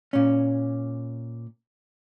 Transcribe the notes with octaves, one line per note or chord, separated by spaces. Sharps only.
A#2 C#4